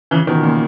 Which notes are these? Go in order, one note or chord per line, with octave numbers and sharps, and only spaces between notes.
C#3 E3
B2 D#3
A#2 C#3